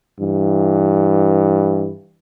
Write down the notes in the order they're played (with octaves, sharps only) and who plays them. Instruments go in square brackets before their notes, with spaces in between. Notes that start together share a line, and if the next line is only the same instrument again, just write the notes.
[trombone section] G2 E3